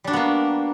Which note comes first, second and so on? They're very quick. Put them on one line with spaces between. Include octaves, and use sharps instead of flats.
G3 D4 F#4 B3 A#3